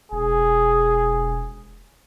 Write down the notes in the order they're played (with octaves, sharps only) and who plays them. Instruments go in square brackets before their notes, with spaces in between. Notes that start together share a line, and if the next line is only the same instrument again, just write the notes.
[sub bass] E1 [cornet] G#4